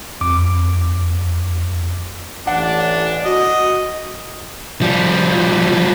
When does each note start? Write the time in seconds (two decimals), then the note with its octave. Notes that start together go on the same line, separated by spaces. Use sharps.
0.21 F2 D6
2.47 A1 D4 F#5
3.25 F#4 D#5
4.82 F3 G3